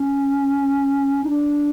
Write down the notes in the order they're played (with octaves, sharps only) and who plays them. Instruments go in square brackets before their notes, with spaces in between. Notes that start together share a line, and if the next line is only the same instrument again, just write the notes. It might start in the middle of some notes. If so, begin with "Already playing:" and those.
Already playing: [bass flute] C#4
D#4
D4